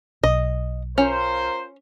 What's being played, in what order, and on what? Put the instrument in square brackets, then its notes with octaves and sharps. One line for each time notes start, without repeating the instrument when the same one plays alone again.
[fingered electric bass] B1 [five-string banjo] D#5
[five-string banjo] C#4 [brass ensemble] F4 A#4 C5